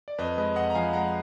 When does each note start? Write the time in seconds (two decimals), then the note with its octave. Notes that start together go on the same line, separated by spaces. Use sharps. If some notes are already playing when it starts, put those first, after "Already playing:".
0.08 D5
0.18 F2 B4 D#5
0.38 G#3 B4 D#5
0.56 F2 D#5 F#5
0.70 A#5
0.75 F3 F5 G#5
0.93 G#3 F#5 A#5